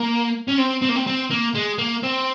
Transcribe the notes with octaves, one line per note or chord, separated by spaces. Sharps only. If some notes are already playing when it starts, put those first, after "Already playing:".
Already playing: A#3
C#4
C4
C4
A#3
C4
C4
A#3
G#3
A#3
C4